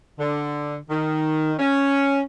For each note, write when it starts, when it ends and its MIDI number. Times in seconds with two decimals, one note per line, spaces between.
0.19 0.75 50
0.89 1.53 51
1.59 2.20 61